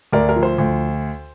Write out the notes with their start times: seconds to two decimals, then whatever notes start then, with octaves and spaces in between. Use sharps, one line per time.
0.13 D2 A#4 D5
0.29 A#4
0.36 F3
0.43 C5
0.58 D2